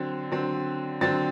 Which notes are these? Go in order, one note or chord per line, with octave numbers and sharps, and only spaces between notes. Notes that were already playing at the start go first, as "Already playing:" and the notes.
Already playing: D3 F#3 C4
D3 F#3 C4
D3 F#3 C4 A6